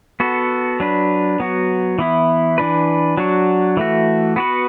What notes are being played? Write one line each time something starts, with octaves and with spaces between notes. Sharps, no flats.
B3 F#4 A4
F#3 D4 B4
F#3 B3 F#4
E3 B3 E4
E3 D4 B4
F#3 D4 F#4
E3 A3 F#4
B3 F#4 B4